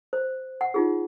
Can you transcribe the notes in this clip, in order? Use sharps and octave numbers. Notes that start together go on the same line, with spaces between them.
C5
F#5
D#4 F4 G#4